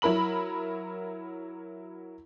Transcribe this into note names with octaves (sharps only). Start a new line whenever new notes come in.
F#3 E4 A#4 B5 F#7